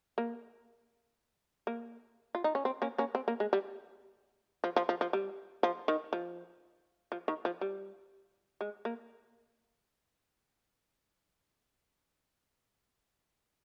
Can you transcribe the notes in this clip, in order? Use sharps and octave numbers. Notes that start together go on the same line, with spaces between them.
A#3
A#3
F4
D#4
C#4
C4
A#3 C#4
A#3 C#4
C4
A#3
G#3
G3
F3
F3
F3
F3
G3
F3
D#3
F3
F3
D#3
F3
G3
G#3
A#3